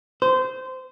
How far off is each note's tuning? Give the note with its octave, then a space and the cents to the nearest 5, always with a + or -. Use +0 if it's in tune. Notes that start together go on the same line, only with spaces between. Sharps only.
C5 -20